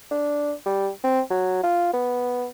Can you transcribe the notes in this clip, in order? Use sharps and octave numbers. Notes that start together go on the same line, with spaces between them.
D4
G3
C4
F#3
F4
B3